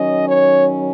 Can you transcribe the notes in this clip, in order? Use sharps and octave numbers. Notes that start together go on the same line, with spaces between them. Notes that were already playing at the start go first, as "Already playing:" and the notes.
Already playing: D#3 F#3 C#4 D#5
C#5